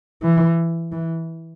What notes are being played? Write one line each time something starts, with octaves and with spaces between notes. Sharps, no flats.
E3
E3